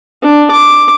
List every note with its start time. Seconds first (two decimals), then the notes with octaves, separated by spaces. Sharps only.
0.22 D4
0.51 D6